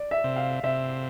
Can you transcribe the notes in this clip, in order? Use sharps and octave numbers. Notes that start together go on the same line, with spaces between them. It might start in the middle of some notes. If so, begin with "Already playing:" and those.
Already playing: D5
E5
C3
F5
C3 E5